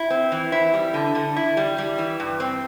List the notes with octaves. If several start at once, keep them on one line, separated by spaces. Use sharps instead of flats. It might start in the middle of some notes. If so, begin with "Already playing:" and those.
Already playing: E4
C4
E3
E4
G3
D3
D3
E4
G3
G3
E3
G2
C4